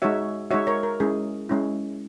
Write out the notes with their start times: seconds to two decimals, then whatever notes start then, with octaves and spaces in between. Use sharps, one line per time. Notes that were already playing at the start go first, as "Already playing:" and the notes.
0.02 G#3 D#4 F#4 C#5 E5
0.51 G#3 D#4 F#4 C#5 E5
0.67 A#4 C#5
0.83 A#4
1.00 G#3 C#4 E4 G#4
1.49 G#3 C#4 E4